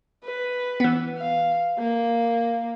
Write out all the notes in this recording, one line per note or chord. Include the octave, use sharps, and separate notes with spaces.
B4
E3 B3
F5
A#3